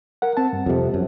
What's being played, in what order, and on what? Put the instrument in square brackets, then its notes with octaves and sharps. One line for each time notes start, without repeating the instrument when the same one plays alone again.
[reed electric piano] A#4 F#5
C4 A5
G2
[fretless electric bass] F2 C3
F#2